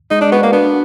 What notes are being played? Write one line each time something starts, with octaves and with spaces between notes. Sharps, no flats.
G#3 D#4
D4
B3 F#4
A#3
B3 D4